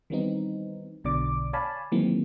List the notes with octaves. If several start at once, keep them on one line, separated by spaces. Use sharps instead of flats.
D#3 E3 G3 B3 C4 D#4
B1 B2 D3 D5 D6
C#5 D5 F5 G#5 A5 B5
D#3 E3 F#3 G#3 A#3 C4